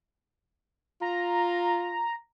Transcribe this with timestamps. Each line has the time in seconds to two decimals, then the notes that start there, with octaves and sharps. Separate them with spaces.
1.01 F4 A#5